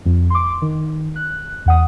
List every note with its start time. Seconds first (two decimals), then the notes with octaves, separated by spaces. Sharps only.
0.06 F2
0.30 C6 D6
0.62 D#3
1.16 F#6
1.66 E2 F#5 D#6